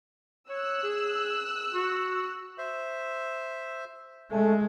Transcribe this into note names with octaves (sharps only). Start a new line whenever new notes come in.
C#5 E6 F#6
G#4
F#4
C5 E5
G#3 A3 C#4